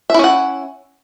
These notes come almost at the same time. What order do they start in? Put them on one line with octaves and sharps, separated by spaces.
E5 E4 C#4 F#5